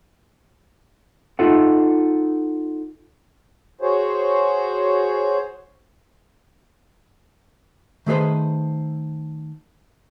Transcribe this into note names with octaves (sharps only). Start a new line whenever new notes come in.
D#4 F4 A4 F#5
F#4 G#4 C5 C#5
D#3 A3 G#4 B4 C5